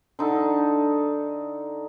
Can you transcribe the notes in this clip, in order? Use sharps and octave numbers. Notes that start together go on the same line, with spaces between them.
D3 D#4 A4